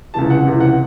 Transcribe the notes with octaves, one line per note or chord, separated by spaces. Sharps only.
C#2 C3 E3 A5
F#5
C#2 C3 E3
F#5